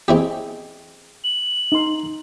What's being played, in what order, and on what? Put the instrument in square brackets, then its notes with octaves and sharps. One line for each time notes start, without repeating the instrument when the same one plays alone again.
[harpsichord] C4 E4 G4 [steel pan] G#4 D#5 G5
[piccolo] F#7
[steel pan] D#4 C6